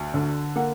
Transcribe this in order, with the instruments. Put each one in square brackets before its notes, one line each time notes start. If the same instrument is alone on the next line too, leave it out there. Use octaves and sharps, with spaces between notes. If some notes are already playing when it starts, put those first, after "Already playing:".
Already playing: [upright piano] D2
D3
A#3 F#5